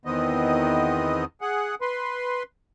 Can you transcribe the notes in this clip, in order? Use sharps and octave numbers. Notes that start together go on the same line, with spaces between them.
E2 D#3 B3 C4 D#5
G#4 F#5
B4 C6